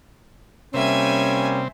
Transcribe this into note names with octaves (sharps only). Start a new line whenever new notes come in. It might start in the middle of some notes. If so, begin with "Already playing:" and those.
C3 G3 A#3 C4 C#4 E5 G#5